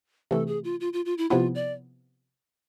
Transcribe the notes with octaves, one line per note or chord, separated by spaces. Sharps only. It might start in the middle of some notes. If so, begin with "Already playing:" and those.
C3 E3 A3 A4
G#4
F4
F4
F4
F4
E4
C3 F3 B3 E4 F4
D5